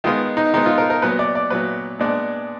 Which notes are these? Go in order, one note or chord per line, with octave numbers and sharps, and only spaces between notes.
D#3 G#3 B3 F4
D#4
D#3 G#3 B3 D#4
F4
A#4
A#4
A#2 F#3 B3 B4
D5
D5
A#2 F#3 B3 B4
A#2 G#3 B3 D4